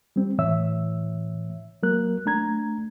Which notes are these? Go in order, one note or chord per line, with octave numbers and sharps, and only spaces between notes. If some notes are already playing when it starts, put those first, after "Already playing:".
G3 C4
A2 E3 C#5 E5 E6
F#3 A#3 A#4 F#6
A3 D4 A#5 G#6